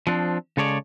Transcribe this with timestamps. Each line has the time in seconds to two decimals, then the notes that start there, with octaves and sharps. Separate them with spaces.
0.07 F3 C4 D4
0.57 C#3 G#3 A4 C#5 D5